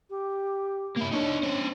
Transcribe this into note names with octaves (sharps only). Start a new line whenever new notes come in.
G4
A#3 E4
D4 D#4 C#5
C#4 C5